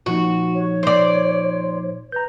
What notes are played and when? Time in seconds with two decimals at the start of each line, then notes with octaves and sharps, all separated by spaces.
0.06 A#2 F3 D#4 F#4
0.54 C#5
0.83 C5 D5
2.12 B4 A#5 G6